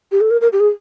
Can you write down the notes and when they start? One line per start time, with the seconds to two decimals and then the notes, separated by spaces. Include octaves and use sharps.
0.12 G4
0.21 A4
0.31 A#4
0.41 A#4
0.53 G4
0.60 G#4